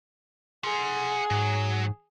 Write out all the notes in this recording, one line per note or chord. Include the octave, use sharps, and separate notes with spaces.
G#4 F#5 C6
G#2 F#3